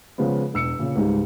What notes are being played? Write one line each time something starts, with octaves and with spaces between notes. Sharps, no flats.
C#3 F3 G#3 B3
E1 E6 C#7
A#2 C#3
C#2 G#2 G3